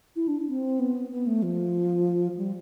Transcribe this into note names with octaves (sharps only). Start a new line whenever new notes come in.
E4
D4
C4
B3
B3
A3
F3
G3